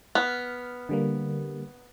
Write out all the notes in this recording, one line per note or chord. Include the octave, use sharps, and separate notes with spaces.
B3 F6
D3 G3 A#3